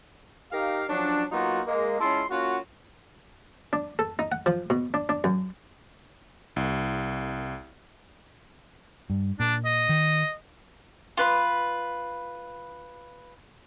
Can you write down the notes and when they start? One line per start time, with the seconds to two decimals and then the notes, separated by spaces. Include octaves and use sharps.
0.51 D#4 G4 A#4 F5
0.89 F3 F#3 C#4 D4
1.31 F#3 A#3 B3 D#4 F4 F#4
1.67 G#3 A#3
1.99 G#3 C#4 E4 F4 A5 C6
2.30 A#3 C#4 F4 F#4
3.73 D4
3.99 A4
4.19 D#4
4.32 F#5
4.46 F3
4.70 B2
4.94 D4
5.09 D4
5.24 F#2
6.56 C2
9.10 G2
9.40 A#2 D4
9.65 D#5
9.89 D#3
11.17 F4 B4 B5